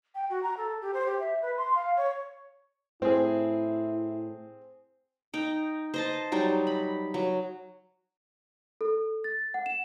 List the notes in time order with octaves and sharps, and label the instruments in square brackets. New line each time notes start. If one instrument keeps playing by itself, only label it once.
[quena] G5
F#4
A#5
A4
G4
C5
G4
E5
B4
C6
F5
C#5
[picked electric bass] A2 [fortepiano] C4 G#4 [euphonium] E4
[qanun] D#4 G5
C5 D#5 A5
F#3 G3 D#4
B5
F#3
[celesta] A4
A6
F#5
E7